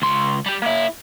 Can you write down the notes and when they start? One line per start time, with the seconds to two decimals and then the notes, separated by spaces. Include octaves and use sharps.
0.02 C#2 C6
0.46 G3 G4
0.62 A#3 E4